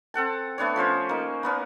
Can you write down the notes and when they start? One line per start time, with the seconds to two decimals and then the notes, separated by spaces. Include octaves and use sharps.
0.14 C4 A4 F#5 A5
0.58 A3 B3 D4 C#5
0.76 F3 C#4 C5 C#5
1.09 A#3 D#4
1.43 A#3 B3 C#4